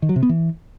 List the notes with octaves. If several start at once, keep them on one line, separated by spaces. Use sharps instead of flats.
D#3
F#3
C3
B3
E3